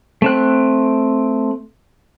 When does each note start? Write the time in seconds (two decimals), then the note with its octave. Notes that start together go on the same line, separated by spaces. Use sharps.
0.22 A3 C4 F#6